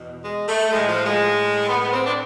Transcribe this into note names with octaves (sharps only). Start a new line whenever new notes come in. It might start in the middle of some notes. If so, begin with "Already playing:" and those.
Already playing: E2 B2
G#3
A3
A2 F3 G#3
F3
G#3
B3
B3
C4
D4